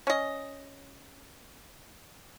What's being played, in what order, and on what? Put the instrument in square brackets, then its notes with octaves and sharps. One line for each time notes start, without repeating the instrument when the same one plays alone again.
[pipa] C#4 D#5